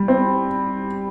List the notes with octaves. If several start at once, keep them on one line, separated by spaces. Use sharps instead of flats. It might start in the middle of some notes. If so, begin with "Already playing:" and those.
Already playing: G3
C4